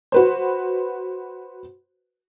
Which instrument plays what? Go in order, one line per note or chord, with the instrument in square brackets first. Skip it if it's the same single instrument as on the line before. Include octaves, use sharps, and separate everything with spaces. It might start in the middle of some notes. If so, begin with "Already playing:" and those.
[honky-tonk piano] F#4 B4 C5